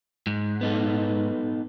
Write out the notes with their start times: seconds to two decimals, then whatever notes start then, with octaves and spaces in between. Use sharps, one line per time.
0.27 G#2
0.61 B3 D#4 A4